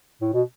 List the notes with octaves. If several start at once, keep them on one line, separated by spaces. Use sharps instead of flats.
A2
B2